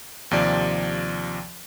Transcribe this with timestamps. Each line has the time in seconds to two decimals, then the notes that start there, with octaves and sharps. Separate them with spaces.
0.31 D#2 C3 F3 D5